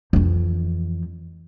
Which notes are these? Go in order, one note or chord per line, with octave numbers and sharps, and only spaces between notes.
F2 E3